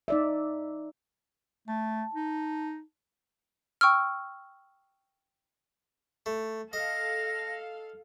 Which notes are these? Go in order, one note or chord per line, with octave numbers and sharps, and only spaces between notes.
D#4 D5 E5
A3 A5
D#4
G5 C#6 E6 F6
A3
A4 D#5 F5 A#6